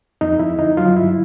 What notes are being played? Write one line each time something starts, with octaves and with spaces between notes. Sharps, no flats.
F2 D#4
F2 E4
D3 D#4
F#3 F4
G2 E4